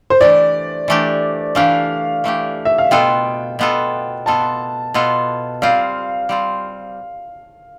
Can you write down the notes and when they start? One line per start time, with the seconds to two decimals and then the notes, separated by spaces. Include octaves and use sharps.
0.10 C5
0.21 E3 A3 D4 G4 D5
0.88 E3 A3 D4 G4
1.55 E3 A3 D4 G4 F5
2.24 E3 A3 D4 G4
2.65 E5
2.78 F5
2.91 B2 B3 F4 A4 G5
3.59 B2 B3 F4 A4
4.26 B2 B3 F4 A4 A5
4.94 B2 B3 F4 A4
5.62 G3 C4 F4 F5
6.29 G3 C4 F4